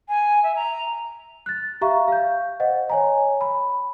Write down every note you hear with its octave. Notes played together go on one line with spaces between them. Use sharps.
G#5
E5
A#5
F#6 A6
G4 E5 F5 A#5 C#6
F5 G6
C5 D#5 F#5
C#5 G#5 A#5
B5